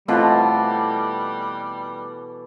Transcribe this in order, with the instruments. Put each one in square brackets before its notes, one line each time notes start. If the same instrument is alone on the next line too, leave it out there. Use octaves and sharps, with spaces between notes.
[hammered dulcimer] B2 E3 [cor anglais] G3 [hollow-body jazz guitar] A3 C4 F4 [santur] A4 F#5